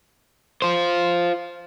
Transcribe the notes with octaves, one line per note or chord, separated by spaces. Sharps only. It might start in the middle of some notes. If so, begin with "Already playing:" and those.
F4 C5